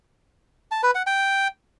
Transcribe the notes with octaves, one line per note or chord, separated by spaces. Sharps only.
A5
B4
F#5
G5